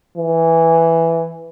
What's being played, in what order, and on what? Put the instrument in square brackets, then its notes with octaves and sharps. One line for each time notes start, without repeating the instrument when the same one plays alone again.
[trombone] E3